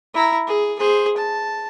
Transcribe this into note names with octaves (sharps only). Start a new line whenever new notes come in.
E4 A#5
G#4
G#4 C5
A5